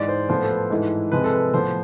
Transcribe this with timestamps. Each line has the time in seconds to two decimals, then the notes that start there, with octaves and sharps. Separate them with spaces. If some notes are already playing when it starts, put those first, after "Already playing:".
Already playing: G#2 E3 G#3 D5
0.08 C5
0.29 A2 F3 B3 C5
0.43 A4
0.50 B4
0.70 G#2 E3 A3 E4
1.12 C3 F3 G#3 B4
1.24 A4
1.32 B4
1.53 A2 F3 B3 C5